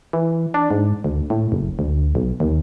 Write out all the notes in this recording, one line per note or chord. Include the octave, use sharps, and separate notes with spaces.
E3
D4
G#2
D2
A2
F#1
D2
B1
D#2